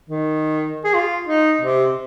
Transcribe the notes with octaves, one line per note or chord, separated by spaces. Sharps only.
D#3
G#4
F4
D#4
C3